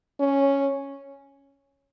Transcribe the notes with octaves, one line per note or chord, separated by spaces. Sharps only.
C#4